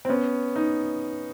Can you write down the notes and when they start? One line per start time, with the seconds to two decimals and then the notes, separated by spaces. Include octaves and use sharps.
0.05 C4
0.09 B3 C#4
0.56 D#4